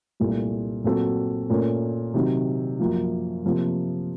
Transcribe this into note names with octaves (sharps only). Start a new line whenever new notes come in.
C2 A#2 A3
A#2 F#3 C4 F#4 A4
A#2 A3 C#4 F4 A#4
C3 D#3 F#3
F#2 F3 A#3 F4
C3 F3 A#3 F4